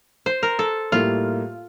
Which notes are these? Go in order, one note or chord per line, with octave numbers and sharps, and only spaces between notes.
C5
A#4
A4
A2 G3 A#3 F4